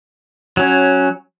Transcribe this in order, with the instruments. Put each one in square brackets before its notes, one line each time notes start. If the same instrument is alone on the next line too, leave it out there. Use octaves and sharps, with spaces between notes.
[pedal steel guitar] F#3 C#4